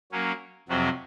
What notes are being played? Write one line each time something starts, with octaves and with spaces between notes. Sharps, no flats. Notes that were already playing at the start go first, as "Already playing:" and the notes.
F#3 A#3 C#4
F2 C3 F#3 C4 F#4